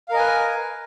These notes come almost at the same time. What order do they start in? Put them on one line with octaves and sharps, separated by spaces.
F5 A#4 D#5 G#5 B4